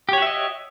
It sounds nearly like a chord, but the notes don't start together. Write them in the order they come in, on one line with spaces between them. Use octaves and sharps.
G4 C#5 F#4 E5 D#5